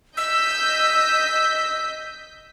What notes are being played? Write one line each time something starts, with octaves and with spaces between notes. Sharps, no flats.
D#5 E6 G6 B6